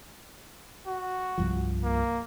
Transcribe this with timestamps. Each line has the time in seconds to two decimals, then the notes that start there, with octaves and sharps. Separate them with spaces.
0.87 F#4
1.38 C2 G2 F3
1.83 A#3